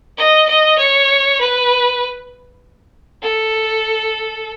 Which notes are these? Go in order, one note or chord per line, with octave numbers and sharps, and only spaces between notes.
D#5
D#5
C#5
B4
A4